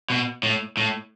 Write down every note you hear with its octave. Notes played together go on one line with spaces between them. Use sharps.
B2
A2
A2